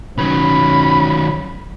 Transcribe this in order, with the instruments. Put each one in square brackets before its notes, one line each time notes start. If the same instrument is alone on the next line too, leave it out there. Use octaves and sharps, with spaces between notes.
[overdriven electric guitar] D#3 F#3 [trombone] C#4 [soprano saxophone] B5